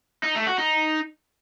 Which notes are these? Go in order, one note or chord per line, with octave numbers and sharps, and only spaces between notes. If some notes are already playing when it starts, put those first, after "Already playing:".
D#4
A3
F#4
D#4